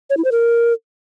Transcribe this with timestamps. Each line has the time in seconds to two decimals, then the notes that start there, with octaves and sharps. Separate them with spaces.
0.10 C#5
0.17 E4
0.24 C5
0.32 A#4